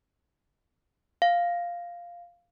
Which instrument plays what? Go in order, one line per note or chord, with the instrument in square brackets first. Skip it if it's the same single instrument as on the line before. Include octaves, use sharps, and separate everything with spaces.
[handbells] F5